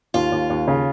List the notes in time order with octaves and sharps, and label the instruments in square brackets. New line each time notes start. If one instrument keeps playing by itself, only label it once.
[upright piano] D#2 [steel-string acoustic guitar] F4
[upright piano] D#2
D#2
C#3